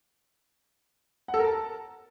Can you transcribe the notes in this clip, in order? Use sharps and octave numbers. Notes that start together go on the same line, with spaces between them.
F#5
A4
A#4
A5